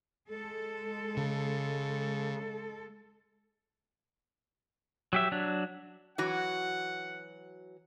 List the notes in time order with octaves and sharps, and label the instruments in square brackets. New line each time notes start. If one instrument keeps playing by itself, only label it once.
[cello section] G#3 A4
[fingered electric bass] C#3
[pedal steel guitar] F#3 G4 E5
F#3 D4
[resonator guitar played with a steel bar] E3 F#3 F#4 [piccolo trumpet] F#5